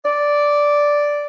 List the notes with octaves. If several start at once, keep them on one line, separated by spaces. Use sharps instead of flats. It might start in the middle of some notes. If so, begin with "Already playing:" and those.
D5